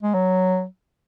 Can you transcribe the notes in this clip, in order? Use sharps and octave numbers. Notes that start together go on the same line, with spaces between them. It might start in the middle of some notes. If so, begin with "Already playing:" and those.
G#3
F#3